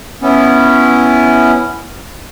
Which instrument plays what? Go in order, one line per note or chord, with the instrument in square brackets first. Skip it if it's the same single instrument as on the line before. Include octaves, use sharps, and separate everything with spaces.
[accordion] B3 C#4 E4